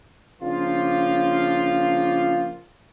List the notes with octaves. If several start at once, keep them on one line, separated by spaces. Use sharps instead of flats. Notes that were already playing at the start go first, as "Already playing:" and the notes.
C#3 F3 A#3 D4 F4